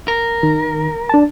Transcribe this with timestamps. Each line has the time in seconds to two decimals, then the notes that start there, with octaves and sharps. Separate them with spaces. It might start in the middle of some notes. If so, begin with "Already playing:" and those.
0.08 A#4
0.43 D#3
1.09 D4 A5